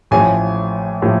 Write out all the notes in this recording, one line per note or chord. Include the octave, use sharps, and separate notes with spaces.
A1 A2 F3 G#5
A2 F3